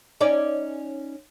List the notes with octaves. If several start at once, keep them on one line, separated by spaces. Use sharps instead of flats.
C#4 D#4 D5